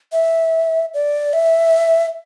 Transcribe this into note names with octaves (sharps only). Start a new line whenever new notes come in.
E5
D5
E5